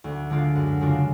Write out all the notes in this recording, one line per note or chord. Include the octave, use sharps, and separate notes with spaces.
D2
D3 G#3 D4 F4
F#2
C#3 G#3 D4 F4